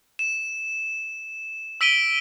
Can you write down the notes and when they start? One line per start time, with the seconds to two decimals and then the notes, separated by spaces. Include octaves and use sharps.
0.19 E7
1.81 E6 B6 D7 D#7 G7